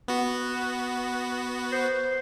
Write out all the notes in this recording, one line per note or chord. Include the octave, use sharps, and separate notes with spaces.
B3 F#4
C5